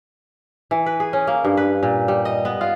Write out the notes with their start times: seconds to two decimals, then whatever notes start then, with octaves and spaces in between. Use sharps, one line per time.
0.71 E3
0.86 B4
1.00 G#4
1.13 C#4
1.27 A#3
1.45 G2
1.57 B4
1.83 A#2
2.08 G3
2.25 D#5
2.45 B3
2.61 F4